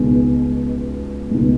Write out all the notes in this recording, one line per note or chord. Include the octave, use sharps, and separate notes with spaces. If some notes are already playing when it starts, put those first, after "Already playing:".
Already playing: C#2 B2 G#3 B3 D#4
C#2 B2 G#3 D#4